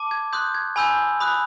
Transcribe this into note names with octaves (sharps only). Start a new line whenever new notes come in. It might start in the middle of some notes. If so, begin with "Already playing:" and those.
Already playing: A5 D6
G#6
C6 D#6 F#6 G6
G#6
G#5 B5 E6 G6
B5 D#6 F#6